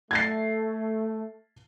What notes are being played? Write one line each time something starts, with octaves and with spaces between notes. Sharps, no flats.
A3 G#6 A6 C7